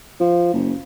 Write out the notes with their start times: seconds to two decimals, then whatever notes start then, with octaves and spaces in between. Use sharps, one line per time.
0.20 F3
0.54 F#1